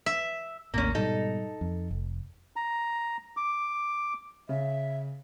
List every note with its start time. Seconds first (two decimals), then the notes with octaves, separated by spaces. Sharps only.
0.06 E5
0.74 A1 D#2 A2 A#3 C#4
0.95 G#2 B2 G3 D#4 A4
1.61 F2
1.91 F1
2.56 A#5
3.37 D6
4.49 C#3 E5